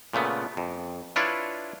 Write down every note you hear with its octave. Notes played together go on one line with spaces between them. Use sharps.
A#2 C#3 A3 B3
F2
D4 E4 F4 B4 C#5 D5